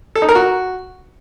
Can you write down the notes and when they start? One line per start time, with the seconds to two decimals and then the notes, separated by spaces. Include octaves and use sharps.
0.16 A4
0.22 D#4
0.29 A#4
0.35 F#4